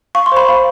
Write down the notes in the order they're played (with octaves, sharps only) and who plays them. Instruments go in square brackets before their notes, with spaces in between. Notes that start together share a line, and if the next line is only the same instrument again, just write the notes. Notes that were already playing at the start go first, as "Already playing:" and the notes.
[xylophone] F5 C#6
C6
C5 B5
F5